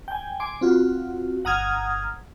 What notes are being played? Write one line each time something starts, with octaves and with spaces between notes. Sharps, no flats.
G5 G#5
G#5 C6 D6
C4 F4 F#4
G1 F#5 A#5 D#6 F6 G#6